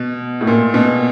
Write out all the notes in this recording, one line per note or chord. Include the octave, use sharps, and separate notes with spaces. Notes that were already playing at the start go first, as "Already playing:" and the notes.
Already playing: B2
A2
A#2
B2